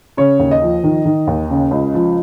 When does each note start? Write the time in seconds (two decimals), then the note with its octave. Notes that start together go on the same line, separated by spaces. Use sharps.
0.17 C#3 C#5
0.39 D#2
0.51 D#5
0.62 F3
0.84 D#3
1.05 D#3
1.27 D#2
1.50 C#3
1.71 C#2
1.94 F3